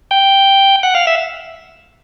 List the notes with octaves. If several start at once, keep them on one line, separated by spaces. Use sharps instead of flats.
G5
F#5
F5
E5